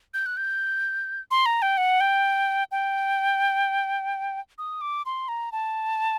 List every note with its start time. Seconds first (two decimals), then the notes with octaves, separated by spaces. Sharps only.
0.14 G6
0.26 F#6
0.37 G6
1.31 C6
1.46 A#5
1.62 G5
1.77 F#5
2.01 G5
2.71 G5
4.58 D#6
4.81 D6
5.06 C6
5.28 A#5
5.52 A5